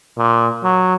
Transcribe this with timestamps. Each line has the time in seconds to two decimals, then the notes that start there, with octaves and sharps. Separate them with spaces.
0.17 A#2
0.64 F#3